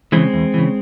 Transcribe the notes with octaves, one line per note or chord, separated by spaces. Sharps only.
C#3 E3 G#3 C4
E2
C#3 E3